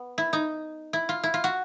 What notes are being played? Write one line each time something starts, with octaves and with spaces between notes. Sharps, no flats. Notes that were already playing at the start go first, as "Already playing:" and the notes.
Already playing: B3
E4
D#4
E4
F4
E4
F4
F#4